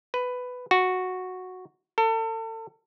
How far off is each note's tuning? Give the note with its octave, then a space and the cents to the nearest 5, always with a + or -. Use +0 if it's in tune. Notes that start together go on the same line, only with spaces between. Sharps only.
B4 +10
F#4 -5
A4 +35